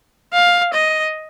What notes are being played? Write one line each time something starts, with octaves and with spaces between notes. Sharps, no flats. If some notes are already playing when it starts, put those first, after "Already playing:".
F5
D#5